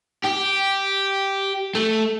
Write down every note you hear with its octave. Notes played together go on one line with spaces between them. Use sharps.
G4
A3